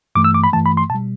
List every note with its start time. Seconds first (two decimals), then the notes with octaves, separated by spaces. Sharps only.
0.15 G2 E3 A3 D6
0.24 E6
0.34 D6
0.44 B5
0.53 G2 E3 A3 A5
0.66 B5
0.77 C6
0.90 B2 G3 A5